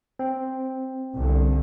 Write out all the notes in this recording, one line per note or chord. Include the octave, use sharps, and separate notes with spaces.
C4
C2 G2 D3